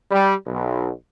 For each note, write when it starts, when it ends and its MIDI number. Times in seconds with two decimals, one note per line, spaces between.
0.11 0.33 55
0.47 0.89 35